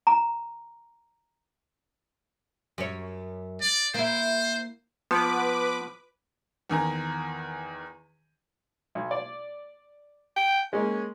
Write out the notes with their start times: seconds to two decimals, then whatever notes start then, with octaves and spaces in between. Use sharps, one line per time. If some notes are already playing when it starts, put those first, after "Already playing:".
0.07 A#5
2.78 F#2 C#5
3.61 D5
3.94 A#3 E4 C5
5.11 F3 B3 B4 D6
6.70 E2 D#3 G#5 A#5
8.95 B1
9.11 D5
10.36 G5
10.73 G#3 A#3 C#4